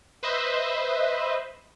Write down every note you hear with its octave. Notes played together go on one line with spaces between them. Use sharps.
B4 C5 D#5 E5